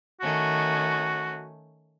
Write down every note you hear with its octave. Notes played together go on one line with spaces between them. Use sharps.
D#3 A3 C#4 F#4